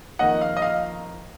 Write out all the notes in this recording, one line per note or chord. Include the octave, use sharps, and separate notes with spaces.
F2 D#3 A#3 D#5 F#5
F5
D#5
F5